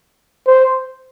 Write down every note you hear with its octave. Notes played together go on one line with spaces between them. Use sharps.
C5